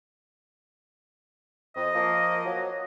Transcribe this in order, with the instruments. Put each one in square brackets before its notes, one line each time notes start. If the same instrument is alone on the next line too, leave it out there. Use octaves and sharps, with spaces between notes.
[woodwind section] F2 [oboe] D#5
[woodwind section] F3 A#3
F#3